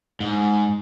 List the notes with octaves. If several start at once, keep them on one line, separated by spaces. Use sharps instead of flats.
G#2